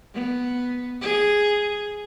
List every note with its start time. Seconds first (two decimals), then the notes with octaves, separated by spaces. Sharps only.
0.14 B3
1.01 G#4